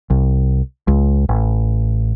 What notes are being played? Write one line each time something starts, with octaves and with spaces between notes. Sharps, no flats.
C2
C#2
A1